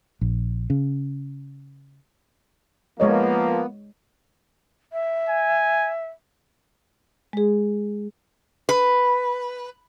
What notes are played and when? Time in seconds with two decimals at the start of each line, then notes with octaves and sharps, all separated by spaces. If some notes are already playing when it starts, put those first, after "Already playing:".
0.21 A#1
0.70 C#3
3.00 F3 G#3 A#3 B3 C#5 D#5
4.93 E5
5.29 G#5
7.33 G#3 G#4
8.69 B4